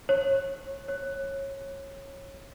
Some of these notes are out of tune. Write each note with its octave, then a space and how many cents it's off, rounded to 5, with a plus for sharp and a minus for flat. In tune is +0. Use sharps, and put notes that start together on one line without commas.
C#5 -25
C#5 -20